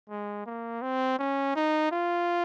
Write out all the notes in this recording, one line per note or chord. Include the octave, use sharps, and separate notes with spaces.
G#3
A#3
C4
C#4
D#4
F4